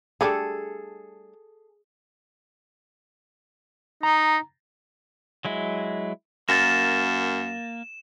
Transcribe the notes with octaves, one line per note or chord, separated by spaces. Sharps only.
G3 A3 D4 G#4 A4
D#4 A#5
F#3 G#3 E4
F#2 A#3 A6 A#6 E7